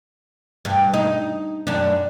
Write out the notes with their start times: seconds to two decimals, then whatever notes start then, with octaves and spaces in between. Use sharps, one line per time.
0.65 G2
0.94 D#4
1.67 F#2 D4